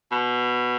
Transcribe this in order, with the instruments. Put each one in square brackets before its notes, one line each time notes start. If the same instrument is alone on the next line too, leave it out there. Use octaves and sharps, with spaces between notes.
[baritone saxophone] B2